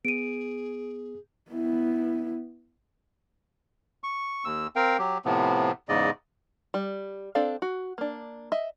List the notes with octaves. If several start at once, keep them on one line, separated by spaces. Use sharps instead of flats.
B3 G#4 D7 D#7
B3 E4
C#6
D#2 E6
C4 A#4 F5 G5
F#3 G4
A2 C3 F3 B3
E2 G#2 C#3 D5 D#5
G3
C4 D4 A4 F5
F#4
A#3 D4
D#5 E5